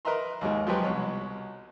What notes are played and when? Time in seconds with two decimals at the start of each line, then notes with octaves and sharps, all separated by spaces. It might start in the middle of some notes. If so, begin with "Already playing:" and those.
0.05 A#4 B4 D#5 E5 A#5 C6
0.41 D#2 G#2 G#3
0.67 F3 F#3 G#3 G4 B4
0.83 C2 B2 C#5